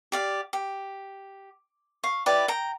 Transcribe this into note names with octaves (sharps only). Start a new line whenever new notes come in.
G4 D5 F5
G4
F5 C#6
E4 G4 B4 D5
G5 A#5